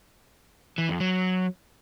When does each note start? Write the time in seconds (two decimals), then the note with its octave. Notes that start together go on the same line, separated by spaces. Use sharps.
0.78 E3
0.89 F2
1.00 F#3